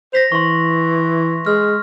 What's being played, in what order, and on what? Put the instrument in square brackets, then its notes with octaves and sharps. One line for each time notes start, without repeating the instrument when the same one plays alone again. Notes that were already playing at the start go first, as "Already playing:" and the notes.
[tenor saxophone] C5 [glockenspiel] A#6 B6 F7
[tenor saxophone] E3 [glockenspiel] C6 C#6
[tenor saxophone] G#3 [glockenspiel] F6